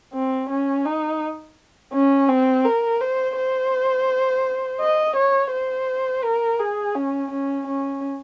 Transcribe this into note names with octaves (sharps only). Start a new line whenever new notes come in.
C4
C#4
D#4
C#4
C4
A#4
C5
C5
D#5
C#5
C5
A#4
G#4
C#4
C#4
C#4